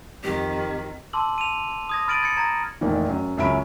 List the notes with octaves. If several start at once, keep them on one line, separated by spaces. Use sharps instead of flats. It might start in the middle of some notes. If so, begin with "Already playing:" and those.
F2 D#3 G4
A5 C6 D6 E6 F#7
D#7 F7
D#6 G#6 A#6
B5 F6 A6 D7 D#7 F#7
G#6 A6 C#7
A#5 G#6 A#6
F1 A#1 D#3 E3
F#2
C#2 F#2 C#4 E5 B5 D7